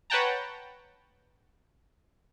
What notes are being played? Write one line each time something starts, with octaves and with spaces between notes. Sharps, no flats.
B4 C#5 F#5 G5 A5 A#5